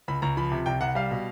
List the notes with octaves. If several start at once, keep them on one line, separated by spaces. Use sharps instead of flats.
C#2 B5
C#2 A#5
F3 B5
C3
C2 G5
C2 F#5
G3 F5
B2